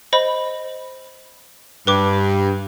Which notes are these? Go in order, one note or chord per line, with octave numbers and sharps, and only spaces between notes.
C5 D#5 B5
G2 B4 D6